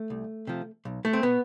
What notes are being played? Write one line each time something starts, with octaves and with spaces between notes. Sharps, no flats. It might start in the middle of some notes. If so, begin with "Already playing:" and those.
Already playing: A3
C2
C3 F3
B1
A3
C4
B2 B3